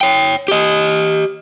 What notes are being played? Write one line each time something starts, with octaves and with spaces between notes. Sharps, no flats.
C#5 G5
G4 D#5